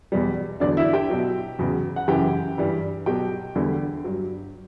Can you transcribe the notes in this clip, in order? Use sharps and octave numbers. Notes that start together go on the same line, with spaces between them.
E2 B2 G3
E2 D3 F#3 D4 D5
E4 E5
G4 G5
B2 F#3
E2 C#3 F#3
F#5
F#2 C#3 E3 G4 G5
G2 E3 G3
B2 F#3 G4 G5
E2 D3 G3
G2 F#3